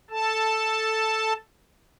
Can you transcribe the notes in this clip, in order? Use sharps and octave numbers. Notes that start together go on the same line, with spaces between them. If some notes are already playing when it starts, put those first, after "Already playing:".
A4 A5